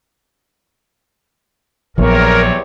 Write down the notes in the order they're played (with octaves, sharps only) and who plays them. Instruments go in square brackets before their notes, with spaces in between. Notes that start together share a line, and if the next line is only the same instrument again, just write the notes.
[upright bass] A#1 [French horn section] E2 C3 C#5 [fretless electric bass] F3 F#3 B3 [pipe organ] A#4